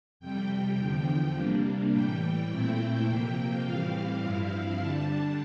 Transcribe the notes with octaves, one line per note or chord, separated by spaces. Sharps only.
F2 C3 G3 G5
E2 D3 F3
C3 G3 A#3 D4
A2 E3 G3 G5
A#2 A3 C4 E4 G5
F2 C3 F3 A#3
A2 E3 G3 C4 F5
G2 F3 C4 E4
D3 G3 D4 A5